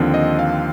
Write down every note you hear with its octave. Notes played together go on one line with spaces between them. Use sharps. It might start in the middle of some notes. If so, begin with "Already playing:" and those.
Already playing: D#2 D3 F3 C4
D#5
F5